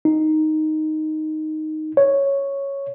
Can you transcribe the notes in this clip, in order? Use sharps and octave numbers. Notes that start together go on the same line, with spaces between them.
D#4
C#5